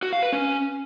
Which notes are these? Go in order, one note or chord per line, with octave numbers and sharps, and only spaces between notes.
F#4
F5
B4
C#4